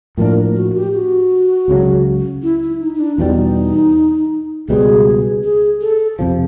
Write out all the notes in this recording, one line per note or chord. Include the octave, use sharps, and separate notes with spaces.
A2 F3 A#3 D4 A#4
F#4
G4
F#4
C#2 C#3 F#3
E4
E4
D#4
D#4
D4
E2 B2 G3 D#4
C#2 B2 G3 G#4
G#4
A4
F2 C3 F3